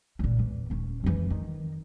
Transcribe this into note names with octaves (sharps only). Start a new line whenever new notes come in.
D2 A#2
E2
D#1 C#4
F2 E3
D#3